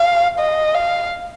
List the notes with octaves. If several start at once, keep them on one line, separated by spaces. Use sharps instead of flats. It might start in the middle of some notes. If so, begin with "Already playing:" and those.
Already playing: F5
D#5
F5